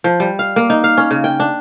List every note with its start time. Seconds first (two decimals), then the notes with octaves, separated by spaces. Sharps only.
0.04 F3
0.20 G3
0.39 F5
0.56 A#3
0.70 D#4
0.84 F5
0.97 C#4
1.11 C#3
1.24 G5
1.40 D4